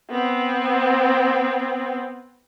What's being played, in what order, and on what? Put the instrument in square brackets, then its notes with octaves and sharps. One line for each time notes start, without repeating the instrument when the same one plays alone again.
[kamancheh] B3 C4